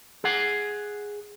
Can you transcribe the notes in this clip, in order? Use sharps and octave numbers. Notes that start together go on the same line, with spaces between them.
G#4 F#5